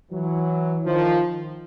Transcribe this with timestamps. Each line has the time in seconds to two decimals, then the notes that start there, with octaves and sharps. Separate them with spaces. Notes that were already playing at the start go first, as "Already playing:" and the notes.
0.12 E3 F#3
0.85 D#3 F3